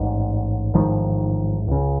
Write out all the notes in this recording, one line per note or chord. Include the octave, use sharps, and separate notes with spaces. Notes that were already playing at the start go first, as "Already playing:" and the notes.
Already playing: A1 G#2
A1 G#2 D#3 F3
C#2 C#3